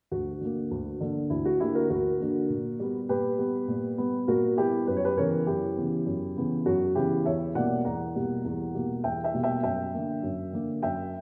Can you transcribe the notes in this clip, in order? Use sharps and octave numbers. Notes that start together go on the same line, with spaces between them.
D2 F#4
D3 A#3
D2
D3 A#3
D2 E4
F#4
D3 A#3 E4 G4
F#4 A#4
D2 F#4 A#4
D3 A#3
A#2
G3 B3
A#2 G4 B4
G3 B3
A#2
G3 B3
A#2 F#4 A#4
G3 B3 E4 G4
F#2 B4
C#5
G4 B4
C#3 E3 B3 A#4 C#5
F#2 E4 G4
C#3 E3 B3
F#2
C#3 E3 B3
F#2 F#4
C#3 E3 B3 E4 G4
E2 C#5 E5
B2 G3 A#3 D5 F#5
E2 F#5 A#5
B2 G3 A#3
E2
B2 G3 A#3
E2 E5 G5
E5 G5
B2 G3 A#3
E5 G5
F#2 E5 G5
D3 A#3
F#2
D3 A#3
F#2 E5 G5